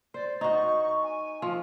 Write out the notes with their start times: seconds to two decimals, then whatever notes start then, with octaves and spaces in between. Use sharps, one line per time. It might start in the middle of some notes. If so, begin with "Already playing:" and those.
0.14 C5 D5
0.41 D#4 F#4 C#6
1.03 G#5
1.42 F3